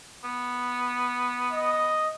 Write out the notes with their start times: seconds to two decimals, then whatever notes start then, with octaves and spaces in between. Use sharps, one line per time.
0.24 B3
1.53 D#5